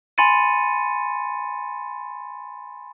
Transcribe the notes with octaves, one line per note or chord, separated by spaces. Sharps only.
G#5 B5 C6 A6 C#7 D#7